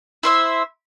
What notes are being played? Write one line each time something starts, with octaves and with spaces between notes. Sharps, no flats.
E4 C5 E5